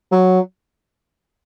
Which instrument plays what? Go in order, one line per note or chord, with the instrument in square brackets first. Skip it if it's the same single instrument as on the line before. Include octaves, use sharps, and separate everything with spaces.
[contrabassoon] F#3